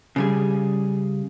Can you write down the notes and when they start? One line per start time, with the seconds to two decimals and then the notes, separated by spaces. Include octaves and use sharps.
0.16 C#3 G3 G#4